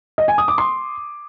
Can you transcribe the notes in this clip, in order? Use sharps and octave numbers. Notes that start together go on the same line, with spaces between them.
D#5
G#5
D#6
D6
C6